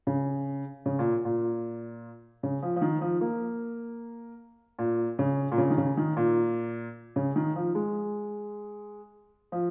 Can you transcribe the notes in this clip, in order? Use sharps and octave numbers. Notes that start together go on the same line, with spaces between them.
C#3
C#3
A#2
A#2
C#3
F3
F3
D#3
F3
A#3
A#2
C#3
A#2
C#3
D#3
C#3
D#3
A#2
C#3
D#3
F3
G#3
F3